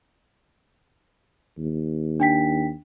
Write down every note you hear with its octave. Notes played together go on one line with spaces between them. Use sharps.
D#2
D4 G5 B6